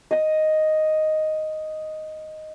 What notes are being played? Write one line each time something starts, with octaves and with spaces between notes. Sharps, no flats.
D#5 D#6